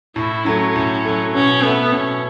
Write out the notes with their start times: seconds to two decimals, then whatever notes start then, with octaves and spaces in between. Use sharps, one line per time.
0.16 A2 E4
0.45 F#3 A3 C#4
0.76 A2
1.05 F#3 A3
1.34 B2 C#4
1.63 A3 B3 E4
1.93 B2 C#4